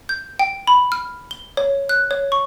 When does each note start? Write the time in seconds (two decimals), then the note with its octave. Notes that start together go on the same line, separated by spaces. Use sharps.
0.09 G6
0.39 G5
0.67 B5
0.92 F6
1.31 G7
1.57 C#5
1.89 F#6
2.11 C#5
2.32 C#6